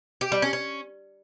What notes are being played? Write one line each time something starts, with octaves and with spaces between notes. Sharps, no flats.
G4
G3
C#4
C#4